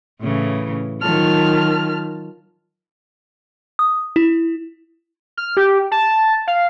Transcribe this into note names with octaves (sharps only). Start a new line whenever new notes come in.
A2 C#3 E3
D#3 F#3 F4 A5 F6
D#6
E4
F6
G4
A5
F5